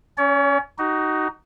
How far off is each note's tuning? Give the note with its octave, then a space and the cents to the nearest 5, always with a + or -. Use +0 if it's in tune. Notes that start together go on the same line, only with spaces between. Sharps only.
C#4 +0 C#5 +40
D#4 +0 F#4 +30